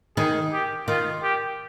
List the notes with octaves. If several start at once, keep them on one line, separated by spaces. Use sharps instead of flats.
D#3 G#4
G4
D#3 F4
G4